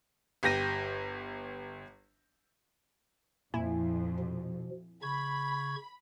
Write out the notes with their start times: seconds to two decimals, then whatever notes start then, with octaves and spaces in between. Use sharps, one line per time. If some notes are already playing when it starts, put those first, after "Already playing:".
0.43 G1 G4 G6 A#6 D#7
3.54 F2 A#2 E4 G#5
4.19 B2 F3
5.02 C#3 B5 C#6 G#6